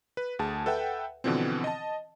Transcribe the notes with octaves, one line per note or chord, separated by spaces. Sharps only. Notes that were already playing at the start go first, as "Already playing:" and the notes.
B4
D2 G#4 A5
A4 B4 E5 F#5 G5
B2 D3 E3 F3 C4
D#5 A5